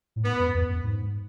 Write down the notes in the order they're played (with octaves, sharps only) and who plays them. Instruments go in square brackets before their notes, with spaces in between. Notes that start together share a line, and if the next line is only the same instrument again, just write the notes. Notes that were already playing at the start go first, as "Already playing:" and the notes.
[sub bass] A2
[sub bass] G#2 [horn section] B3
[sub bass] F#2
E2
F#2
G#2